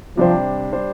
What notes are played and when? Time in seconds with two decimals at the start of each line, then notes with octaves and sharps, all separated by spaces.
0.17 C3 F3 G3 D4 G4 C5
0.72 G3 D4 G4 C5